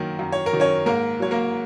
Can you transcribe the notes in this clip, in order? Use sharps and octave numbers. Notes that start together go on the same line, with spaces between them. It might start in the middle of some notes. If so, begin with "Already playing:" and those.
Already playing: F#2 D#3 F#3 A#3 A#4
F#2
C#5
A#4
D#3 F#3
C#4 C#5
G#2 A#3 A#4
F#3 C#5
A#3 A#4